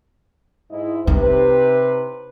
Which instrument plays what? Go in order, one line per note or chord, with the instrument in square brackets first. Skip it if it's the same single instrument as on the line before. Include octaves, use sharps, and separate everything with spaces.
[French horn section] G#2 E4 D#5
[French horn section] C3 B4 [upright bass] D#4